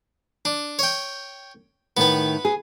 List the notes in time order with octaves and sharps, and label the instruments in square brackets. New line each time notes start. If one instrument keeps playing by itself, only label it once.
[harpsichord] D4
C#5 G5
[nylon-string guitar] A2 D#3 [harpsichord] B3 B4
[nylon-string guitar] G#4